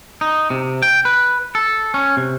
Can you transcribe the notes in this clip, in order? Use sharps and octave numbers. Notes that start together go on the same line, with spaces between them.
D#4
C3
G5
B4
A4
C#4
C3